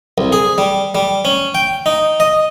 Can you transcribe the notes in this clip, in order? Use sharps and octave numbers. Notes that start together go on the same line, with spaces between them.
C2
G#4
G3
G3
C#4
G5
D#4
D#5